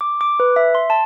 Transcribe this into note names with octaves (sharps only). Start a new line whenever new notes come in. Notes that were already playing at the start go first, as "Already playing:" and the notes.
D6
D6
B4
E5
C6
A5